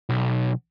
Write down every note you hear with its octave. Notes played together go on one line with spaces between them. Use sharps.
B1